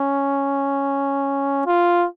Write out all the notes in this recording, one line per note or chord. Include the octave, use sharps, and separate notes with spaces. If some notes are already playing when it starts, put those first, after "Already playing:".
Already playing: C#4
F4